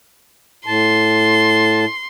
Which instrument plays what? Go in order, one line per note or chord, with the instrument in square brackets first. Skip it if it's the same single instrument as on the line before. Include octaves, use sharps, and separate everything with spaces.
[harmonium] A2 A5 [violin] C6